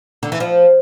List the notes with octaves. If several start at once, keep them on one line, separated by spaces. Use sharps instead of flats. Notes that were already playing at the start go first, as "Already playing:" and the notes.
D3
E3
F3